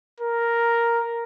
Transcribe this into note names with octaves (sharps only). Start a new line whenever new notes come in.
A#4